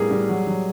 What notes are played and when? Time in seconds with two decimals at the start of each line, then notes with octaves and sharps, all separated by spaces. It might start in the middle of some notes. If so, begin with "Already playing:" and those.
Already playing: A2 G3 B3 G#4 A#4
0.11 G3
0.29 F#3
0.47 F#3